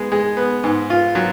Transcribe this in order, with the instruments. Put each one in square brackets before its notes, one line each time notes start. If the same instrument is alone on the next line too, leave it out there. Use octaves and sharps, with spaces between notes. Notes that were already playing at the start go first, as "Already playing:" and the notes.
Already playing: [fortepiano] G#3 B3
G#3
B3
G#2
F4
F#3